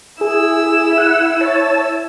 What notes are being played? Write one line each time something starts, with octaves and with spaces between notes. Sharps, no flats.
E4 G#4 E6
F#5
C#5 A5